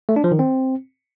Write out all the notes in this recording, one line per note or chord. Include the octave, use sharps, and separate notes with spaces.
A3
D4
F3
D#3
C4